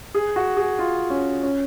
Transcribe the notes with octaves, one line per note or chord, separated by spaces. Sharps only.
G#4
F#4
G#4
F4
C#4
C#4